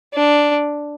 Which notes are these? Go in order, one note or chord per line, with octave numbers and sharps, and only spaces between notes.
D4